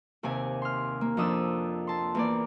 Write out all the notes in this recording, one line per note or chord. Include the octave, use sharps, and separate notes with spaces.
D#2 C3 G#5
C6 F6
A#3
F2 F3 D4 D#6 E6
A5 C6
E2 A#3 D5